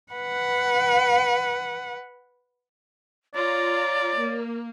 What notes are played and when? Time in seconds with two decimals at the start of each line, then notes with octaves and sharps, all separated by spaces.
0.12 B4 F#5
3.35 F4 C#5 D5 A#5
4.18 A#3